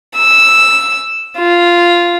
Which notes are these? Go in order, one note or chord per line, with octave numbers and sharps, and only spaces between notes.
E6
F4